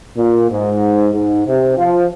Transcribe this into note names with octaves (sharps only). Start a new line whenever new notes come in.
A#2
G#2
G#2
C3
F3